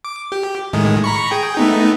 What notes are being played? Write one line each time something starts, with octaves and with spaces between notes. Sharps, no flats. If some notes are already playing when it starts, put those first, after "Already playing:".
D6
G4
A2 D#3 G#3
A#5 B5 C#6
G#4 G5
A3 B3 D#4